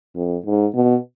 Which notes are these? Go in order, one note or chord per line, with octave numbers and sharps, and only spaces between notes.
F2
G#2
B2